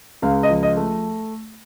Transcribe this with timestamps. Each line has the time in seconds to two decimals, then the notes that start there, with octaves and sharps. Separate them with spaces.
0.22 C#2 F5
0.43 D#5
0.49 F3
0.63 D#5
0.77 A3